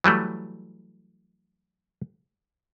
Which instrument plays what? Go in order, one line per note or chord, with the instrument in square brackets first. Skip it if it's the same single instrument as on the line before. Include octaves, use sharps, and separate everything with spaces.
[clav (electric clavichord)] E3 F#3 G3 A3